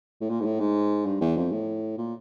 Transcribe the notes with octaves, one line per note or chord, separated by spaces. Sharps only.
A2
A#2
G#2
A2
G#2
G2
E2
F2
A2
A#2